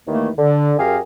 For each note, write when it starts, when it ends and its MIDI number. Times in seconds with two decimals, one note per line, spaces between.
0.07 0.29 39
0.07 0.29 51
0.07 0.29 52
0.07 0.29 57
0.07 0.29 58
0.38 0.73 50
0.78 0.99 42
0.78 0.99 67
0.78 0.99 68
0.78 0.99 70
0.78 0.99 77